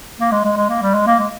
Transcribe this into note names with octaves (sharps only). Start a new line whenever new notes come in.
A#3
G#3
G#3
G#3
A#3
G3
G#3
A#3
G#3